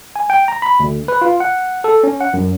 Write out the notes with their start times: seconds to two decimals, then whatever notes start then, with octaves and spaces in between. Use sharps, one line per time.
0.16 G#5
0.30 G5
0.48 A#5
0.62 B5
0.80 D2
1.08 B4
1.21 F4
1.40 F#5
1.84 A4
2.03 C#4
2.21 F#5
2.34 F#2